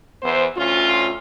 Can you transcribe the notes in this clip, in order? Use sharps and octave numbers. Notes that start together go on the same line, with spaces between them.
E2 E3 B3 C5
D2 C#4 F4